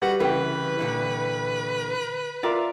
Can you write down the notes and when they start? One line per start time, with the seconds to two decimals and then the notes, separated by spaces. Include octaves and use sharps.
0.02 G3 F#4 B4 F#5
0.20 C2 C#3 E3 B4 G5
0.79 A#2 D3 E3
2.43 F4 A#4 D5 E5